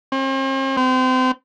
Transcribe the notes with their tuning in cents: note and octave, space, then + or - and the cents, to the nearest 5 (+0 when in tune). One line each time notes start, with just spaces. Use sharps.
C4 +45
C4 -30